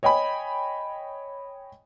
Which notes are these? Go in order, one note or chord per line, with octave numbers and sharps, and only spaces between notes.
C#5 D#5 G5 G#5 B5